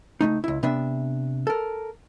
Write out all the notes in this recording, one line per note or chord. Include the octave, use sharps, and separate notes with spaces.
C#2 A#2 A3 D#4
C#2 E4
C3 B3 D4 E5
A4 A#4